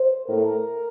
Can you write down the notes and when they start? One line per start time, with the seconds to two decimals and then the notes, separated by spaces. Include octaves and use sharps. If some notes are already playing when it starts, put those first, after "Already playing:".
Already playing: C5
0.29 A2 A3 A#4